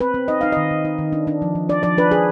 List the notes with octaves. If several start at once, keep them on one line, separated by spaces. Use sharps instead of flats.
C4 B4
C4
D#4 D#5
D#4 F5
D#3 D#5
D#3
D#4
D#3
D4
D4
F3
F3
D4 D5
F3 D5
D4 B4
D4 G#4